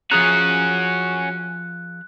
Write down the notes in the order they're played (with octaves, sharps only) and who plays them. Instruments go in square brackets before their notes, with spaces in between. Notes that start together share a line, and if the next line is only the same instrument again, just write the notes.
[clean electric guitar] F3 G#4 A#5 [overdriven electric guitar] C#4 F#4 [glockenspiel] F#6